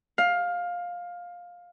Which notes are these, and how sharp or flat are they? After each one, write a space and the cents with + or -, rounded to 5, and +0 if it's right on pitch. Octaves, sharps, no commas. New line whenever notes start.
F5 +15